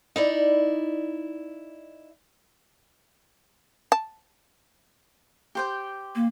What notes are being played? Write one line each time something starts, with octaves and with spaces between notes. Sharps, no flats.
D#4 E4 D5
A5
G4 C5 G5
A#3